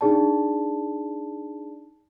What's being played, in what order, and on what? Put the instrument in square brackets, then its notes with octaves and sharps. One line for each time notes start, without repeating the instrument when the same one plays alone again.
[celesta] D4 D#4 G#4 D5 A5